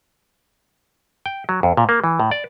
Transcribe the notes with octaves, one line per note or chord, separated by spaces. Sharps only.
G5
F#3
F2
A#2
A#3
E3
A2
D5